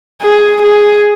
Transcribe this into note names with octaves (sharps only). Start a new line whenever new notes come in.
G#4
G#4